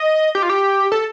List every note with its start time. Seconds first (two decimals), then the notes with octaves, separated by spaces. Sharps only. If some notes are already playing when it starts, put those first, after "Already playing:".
Already playing: D#5
0.35 G4
0.43 F4
0.50 G4
0.92 A4